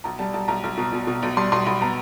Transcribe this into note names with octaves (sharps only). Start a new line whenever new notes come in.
B1 A#5
G3 A5
B1 A5
B1 A#5
B1
B2
B2
B2
B1
G3 C6
B1 C6
B1 B5
B3 A#5